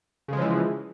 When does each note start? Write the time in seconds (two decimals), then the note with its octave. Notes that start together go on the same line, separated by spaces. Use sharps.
0.28 C#3
0.33 G#3
0.37 F3
0.41 E3